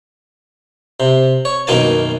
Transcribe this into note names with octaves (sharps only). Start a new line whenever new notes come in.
C3
C#5
F#2 B2 D#3 A#3 G#5 A5